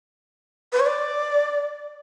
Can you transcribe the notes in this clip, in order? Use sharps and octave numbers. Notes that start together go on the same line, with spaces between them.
B4
C#5
D5